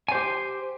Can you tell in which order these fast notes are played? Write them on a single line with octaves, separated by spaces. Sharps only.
G#5 C5 G4